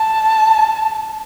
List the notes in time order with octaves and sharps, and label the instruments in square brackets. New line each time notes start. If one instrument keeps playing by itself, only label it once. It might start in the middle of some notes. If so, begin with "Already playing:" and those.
Already playing: [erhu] A5